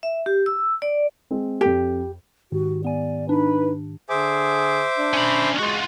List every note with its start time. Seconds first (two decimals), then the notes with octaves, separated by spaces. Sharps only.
0.03 E5
0.26 G4
0.46 E6
0.82 D5
1.31 G#3 C4
1.61 F2 G4 A4
2.52 G#2 D#3 F#4 G4
2.84 B3 D5 G#5
3.29 D4 D#4 B4
4.09 D3 G#4 C5 E5 D6
4.98 D4
5.14 C#4 B5
5.59 G#3 F4 F#4